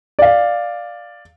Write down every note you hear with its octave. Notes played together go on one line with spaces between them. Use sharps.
D5 F5